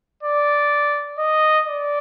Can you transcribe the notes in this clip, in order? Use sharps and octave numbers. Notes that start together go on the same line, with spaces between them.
D5
D#5
D5